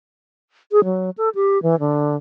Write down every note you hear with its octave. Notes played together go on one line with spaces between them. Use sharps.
G#4
F#3
A4
G4
E3
D3